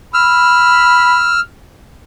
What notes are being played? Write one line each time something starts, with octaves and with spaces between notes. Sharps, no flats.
B5 E6 F6